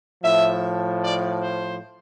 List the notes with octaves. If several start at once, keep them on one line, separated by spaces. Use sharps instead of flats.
A2 F3 E5
D5
C5